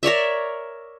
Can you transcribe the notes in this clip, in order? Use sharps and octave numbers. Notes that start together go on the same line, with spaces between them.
A#4 C#5 D5 E5